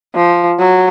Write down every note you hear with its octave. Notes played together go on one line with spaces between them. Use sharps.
F3
F#3